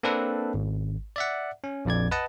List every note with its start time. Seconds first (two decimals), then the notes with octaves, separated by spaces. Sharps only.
0.03 A#3 C4 D4 A4 B4
0.54 G#1
1.16 D5 E5 F#5
1.64 C#4
1.85 A#1 F2 D5 G#6
2.12 B4 D#5 F#5 A5